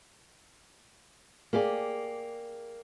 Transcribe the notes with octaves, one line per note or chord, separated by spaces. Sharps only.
A#3 G4 G#4 D5